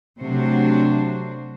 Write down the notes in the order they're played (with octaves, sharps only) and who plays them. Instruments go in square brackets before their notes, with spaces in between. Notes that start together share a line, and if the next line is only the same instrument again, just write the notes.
[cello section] C3 F#3 A3 D4 F#4 C5